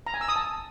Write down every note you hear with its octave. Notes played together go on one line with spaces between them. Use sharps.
A#5
G#5
E6
D#6
A5